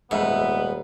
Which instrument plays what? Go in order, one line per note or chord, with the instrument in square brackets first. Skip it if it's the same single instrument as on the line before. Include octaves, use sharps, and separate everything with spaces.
[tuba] D#1 [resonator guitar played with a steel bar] F2 E5 [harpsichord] G#2 [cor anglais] B3